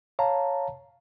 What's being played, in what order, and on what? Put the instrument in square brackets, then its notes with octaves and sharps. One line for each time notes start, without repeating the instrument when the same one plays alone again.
[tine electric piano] C#5 F5 A5 A#5